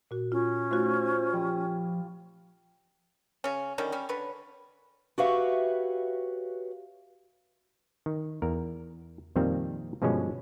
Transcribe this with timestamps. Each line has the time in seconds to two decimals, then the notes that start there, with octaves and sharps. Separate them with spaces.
0.11 A#2 F#4
0.32 C#4 F4
0.71 A3 D#4 F4 F#4 C5
1.33 F3 G3 D#6
3.44 C#3 C#4
3.78 D3 D#3 G3 C#4
3.92 G3 C#4
4.09 D3 B4 C#5
5.18 F#4 G4 B4 C#5 E5 F5
8.06 D#3
8.42 E2 A#4
9.36 F2 A#2 D#3 G3 C4 F5
10.02 G2 B2 D3 F3 G#3 C#4